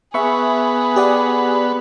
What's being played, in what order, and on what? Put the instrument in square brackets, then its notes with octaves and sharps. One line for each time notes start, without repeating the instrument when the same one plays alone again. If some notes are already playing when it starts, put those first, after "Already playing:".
[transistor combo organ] B3 [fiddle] G#4 [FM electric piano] E5 C#6
[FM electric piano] G4 D5 F#5